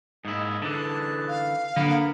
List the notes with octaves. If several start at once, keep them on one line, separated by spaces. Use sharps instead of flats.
G#2 A#3 E4 G#4 D#5
D3 E3 D4 G#4 A5
F5
D3 A#3 B3 A#4 B5